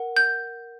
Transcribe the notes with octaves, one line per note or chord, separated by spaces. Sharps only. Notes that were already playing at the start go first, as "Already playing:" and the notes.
Already playing: A#4 F#5
G6